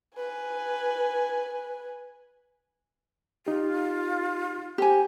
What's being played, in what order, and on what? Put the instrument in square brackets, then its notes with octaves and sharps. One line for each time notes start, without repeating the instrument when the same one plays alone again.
[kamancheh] B4 G#5
[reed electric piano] D#4 G4 [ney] F4
[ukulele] G4 G#5 [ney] C5